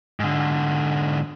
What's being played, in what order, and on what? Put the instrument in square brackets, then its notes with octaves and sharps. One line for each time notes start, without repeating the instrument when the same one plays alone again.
[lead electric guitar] G#2 D3